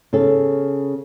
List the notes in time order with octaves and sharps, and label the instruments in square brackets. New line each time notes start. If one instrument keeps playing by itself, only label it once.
[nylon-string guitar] C#3 A4